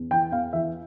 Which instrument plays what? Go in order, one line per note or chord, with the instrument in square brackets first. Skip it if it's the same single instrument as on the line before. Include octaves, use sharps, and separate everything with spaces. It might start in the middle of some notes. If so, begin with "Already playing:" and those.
Already playing: [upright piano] E2
E3 G5
E2 F5
E3 E5